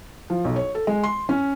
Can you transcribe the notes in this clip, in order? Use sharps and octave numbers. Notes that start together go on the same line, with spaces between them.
F3
B1
C#5
A4
G#3
C6
C#4